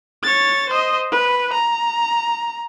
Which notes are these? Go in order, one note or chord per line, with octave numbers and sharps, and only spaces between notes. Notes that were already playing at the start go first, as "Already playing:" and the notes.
C#5 A6
C5 D#5
B4
A#5